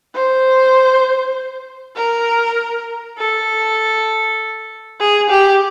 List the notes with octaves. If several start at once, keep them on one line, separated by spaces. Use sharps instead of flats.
C5
A#4
A4
G#4
G4